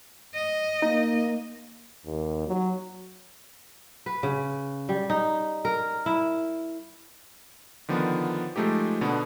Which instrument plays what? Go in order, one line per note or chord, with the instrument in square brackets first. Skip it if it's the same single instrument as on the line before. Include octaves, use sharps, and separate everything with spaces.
[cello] D#5
[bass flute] A#3 [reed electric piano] D#4
[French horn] D#2
F#3
[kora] B4
C#3
G3
D#4
A#4
E4
[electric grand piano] D3 D#3 F3 B3
F3 G#3 A3 D#4 G4
B2 D3 B3 D4